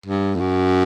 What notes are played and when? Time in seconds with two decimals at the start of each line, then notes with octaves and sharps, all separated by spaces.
0.06 G2
0.35 F2
0.40 F#2